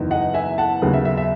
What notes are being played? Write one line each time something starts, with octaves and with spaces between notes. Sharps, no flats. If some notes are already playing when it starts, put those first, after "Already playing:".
Already playing: F#1 E2 D#3
D#5 F#5
E5 G#5
F#5 A5
D#2 C#3 F#3 B3
E5
E5
E5